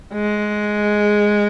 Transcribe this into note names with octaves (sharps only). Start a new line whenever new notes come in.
G#3